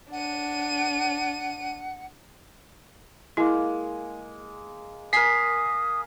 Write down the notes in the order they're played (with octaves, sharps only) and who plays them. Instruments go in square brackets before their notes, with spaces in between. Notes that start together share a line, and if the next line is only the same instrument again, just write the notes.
[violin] D4 D#7 [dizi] F#5
[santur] G#3 A#3 [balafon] E4
[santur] A#4 G#5 [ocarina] D#6 [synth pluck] B6 C7